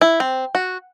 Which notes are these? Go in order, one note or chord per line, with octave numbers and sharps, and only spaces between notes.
E4
C4
F#4